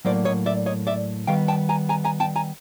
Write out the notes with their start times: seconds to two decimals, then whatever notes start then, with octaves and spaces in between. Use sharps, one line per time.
0.05 A2 F#3 A#3 C5 D5
0.25 C#5 D#5
0.46 D5 E5
0.66 C#5 D#5
0.87 D5 E5
1.27 D#3 G3 B3 F5 G5
1.48 G5 A5
1.69 G#5 A#5
1.89 G#5 A#5
2.05 G#5 A#5
2.20 G5 A5
2.36 G#5 A#5